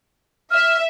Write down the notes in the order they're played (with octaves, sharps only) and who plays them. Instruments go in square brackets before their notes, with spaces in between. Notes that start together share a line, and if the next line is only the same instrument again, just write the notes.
[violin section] E5 [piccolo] F6